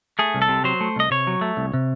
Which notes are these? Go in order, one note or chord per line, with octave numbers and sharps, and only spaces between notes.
A3 G#4
C2
A4
C3
F#3 C5
A3
C2 D#5
C3 C#5
F#3
A3
C2
C3